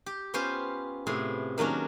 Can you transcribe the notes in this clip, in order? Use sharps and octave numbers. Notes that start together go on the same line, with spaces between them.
G4
B3 C#4 F4 C5
A2 C3 B3 G#4
D#3 F#3 A#3 C#4 D4